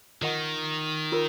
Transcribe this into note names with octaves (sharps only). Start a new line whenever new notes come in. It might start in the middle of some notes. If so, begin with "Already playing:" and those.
D#3 F4 A#4 D#5 F#5 C#6
F4 A#4